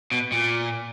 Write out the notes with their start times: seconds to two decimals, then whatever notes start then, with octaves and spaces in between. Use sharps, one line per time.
0.12 B2
0.32 A#2